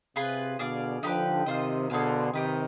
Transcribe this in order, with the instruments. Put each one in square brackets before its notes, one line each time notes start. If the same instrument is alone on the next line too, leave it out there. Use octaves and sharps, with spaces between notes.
[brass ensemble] C3 [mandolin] F4 G#4 B4
[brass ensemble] B2 D3 [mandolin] G#4 D5 F5
[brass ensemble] D3 F3 [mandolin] D#4 G4 B4
[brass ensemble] C3 D#3 [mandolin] F4 C5 D#5
[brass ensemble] B2 D3 [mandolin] G#4 C5 F5 G#5
[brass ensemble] C3 D#3 [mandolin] G4 B4 D#5